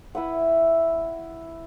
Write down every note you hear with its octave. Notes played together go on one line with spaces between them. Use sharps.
E4 B4 E5 F#5